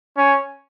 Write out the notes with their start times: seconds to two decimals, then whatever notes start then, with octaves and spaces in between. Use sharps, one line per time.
0.17 C#4